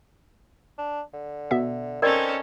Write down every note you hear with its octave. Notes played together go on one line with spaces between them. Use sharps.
D4
D3
B2 B3 E5
C4 C#4 D#4 A4 A#4 D5 D#5